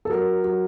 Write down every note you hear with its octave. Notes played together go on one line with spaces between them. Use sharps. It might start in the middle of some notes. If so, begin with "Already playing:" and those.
A4
F#3 A#4
F#3